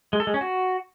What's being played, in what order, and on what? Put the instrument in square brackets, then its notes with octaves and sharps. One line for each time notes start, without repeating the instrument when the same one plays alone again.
[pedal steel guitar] G#3
A4
G#3
C#4
F#4